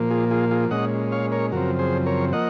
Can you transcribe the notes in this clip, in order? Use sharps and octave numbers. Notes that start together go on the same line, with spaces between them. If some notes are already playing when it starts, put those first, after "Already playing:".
Already playing: A#2 F3 A#3
F4 G#4
F4 G#4
F4 G#4
A#2 G#3 C#4 D#5 F#5
C#5 F5
A#4 C#5
F#2 C#3 F3 C4 F#4 A#4
G#4 C5
A#4 C#5
F3 A#3 D#5 F#5